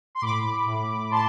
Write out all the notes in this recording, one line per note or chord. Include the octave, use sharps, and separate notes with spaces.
C6
A2 B5 D6
A2
A2 A5 C6